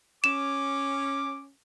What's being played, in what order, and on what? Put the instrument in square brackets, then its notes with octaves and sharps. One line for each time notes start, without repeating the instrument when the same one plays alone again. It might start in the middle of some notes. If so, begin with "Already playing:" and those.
[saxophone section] C#4 [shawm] D6 [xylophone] E7